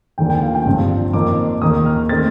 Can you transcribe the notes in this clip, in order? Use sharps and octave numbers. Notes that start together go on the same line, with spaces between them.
D#2 D3 F3 A#3 G5
G5
F5
G5
G1 G2 F3 C4
F2 D#3 A#3 D6
D#2 D#3 A#3 D#6
F6
D#3 A3 C4 A6